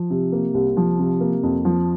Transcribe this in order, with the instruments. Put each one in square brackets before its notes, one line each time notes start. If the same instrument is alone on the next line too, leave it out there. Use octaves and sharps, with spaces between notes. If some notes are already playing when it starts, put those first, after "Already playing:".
Already playing: [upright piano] F3
C3
A#3
C2
F3
C3
A#3
F2
F3